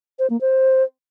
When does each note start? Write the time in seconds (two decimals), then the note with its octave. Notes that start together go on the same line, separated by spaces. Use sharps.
0.19 C5
0.30 A#3
0.41 C5